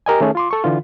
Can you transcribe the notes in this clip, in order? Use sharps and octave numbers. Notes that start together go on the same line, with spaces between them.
G4 A#4 D#5 G#5
D#3 A3 C#4 G#4
F4 C6 D6
A4 C#6
D3 E3 F4